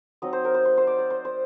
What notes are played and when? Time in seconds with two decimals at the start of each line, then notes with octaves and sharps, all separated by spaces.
0.22 F#3 C4 D#4 D#5
0.33 C5
0.45 A#4
0.54 C5
0.65 C5
0.77 C5
0.87 D5
0.99 D5
1.10 C5
1.25 C5